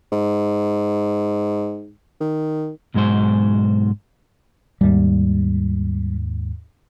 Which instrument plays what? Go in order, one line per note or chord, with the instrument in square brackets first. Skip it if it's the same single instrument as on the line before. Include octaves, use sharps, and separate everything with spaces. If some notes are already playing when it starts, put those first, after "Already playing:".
[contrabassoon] G#2
D#3
[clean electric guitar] B1 G#2 G#3 F#4 C5
[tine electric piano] D#2 G#2 [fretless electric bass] G3